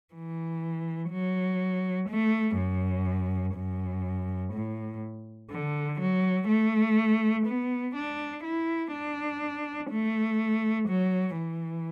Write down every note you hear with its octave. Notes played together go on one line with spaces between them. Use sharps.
E3
F#3
A3
F#2
F#2
A2
D3
F#3
A3
B3
D4
E4
D4
A3
F#3
E3